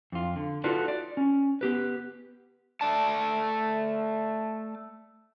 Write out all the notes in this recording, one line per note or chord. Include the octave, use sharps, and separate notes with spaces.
F2 F4
D3
D#4 F4 F#4 A4 B4 D5
D5
C#4
B3 G4 B4
A3 D5 A5